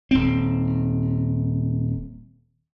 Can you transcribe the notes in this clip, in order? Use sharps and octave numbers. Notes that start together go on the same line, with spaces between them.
D#1 C4